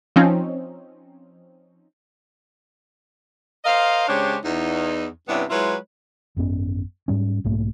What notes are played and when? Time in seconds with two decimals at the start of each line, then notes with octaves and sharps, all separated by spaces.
0.16 F3 C4 C#4 D#4
3.65 A#4 C5 D#5 F5
4.08 C#3 G#3 D4 G4 C5 C#5
4.44 E2 D#4
5.28 G2 C3 B3 C#4 D4 E4
5.50 F#3 G#3 E4 F4 B4 C#5
6.37 G#1 F#2 B3 C#4
7.08 G#2 G3 C#4
7.44 B1 G#2 A3 A#3